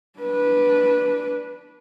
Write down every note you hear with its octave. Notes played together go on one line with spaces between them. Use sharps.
D4 B4